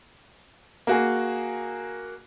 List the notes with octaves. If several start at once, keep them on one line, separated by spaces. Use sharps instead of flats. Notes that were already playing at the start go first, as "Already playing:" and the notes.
A#3 F#4 G#4